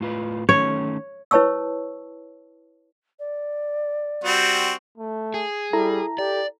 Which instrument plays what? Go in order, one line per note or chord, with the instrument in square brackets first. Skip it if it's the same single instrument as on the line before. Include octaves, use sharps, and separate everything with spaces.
[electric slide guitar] A2 F4 B4
[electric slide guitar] D#3 A3 C#4 [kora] C#5
[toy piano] E4 B4 C#5 A5 C#6 E6
[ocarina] D5
[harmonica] G3 C4 F#4
[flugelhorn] A3
[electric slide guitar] G#4
[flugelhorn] G3 [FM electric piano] E4 A4 A#5
[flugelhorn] G4 [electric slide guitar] D5